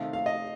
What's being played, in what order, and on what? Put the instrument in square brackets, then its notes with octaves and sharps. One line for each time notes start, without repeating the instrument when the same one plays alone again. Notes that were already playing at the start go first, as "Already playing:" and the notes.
Already playing: [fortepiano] C3 D#3 A3 F5
F5
D#5